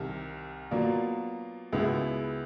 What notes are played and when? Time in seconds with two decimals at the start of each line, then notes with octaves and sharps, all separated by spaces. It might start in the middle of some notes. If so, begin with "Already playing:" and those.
Already playing: C2 C3 D#3
0.71 B2 F#3 A#3 D4 F4
1.73 C#2 B2 G#3 B3 E4